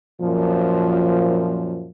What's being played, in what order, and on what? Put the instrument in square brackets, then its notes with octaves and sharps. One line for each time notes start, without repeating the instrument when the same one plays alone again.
[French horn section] F#2 A#2 F3